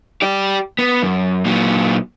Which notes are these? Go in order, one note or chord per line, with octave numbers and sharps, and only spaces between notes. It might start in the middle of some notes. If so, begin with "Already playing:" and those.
G4 D5
B3
F#2
A#2 F#3